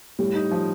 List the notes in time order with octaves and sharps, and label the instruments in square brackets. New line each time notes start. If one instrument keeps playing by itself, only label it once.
[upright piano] A2 [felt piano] G3
[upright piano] D#4
F3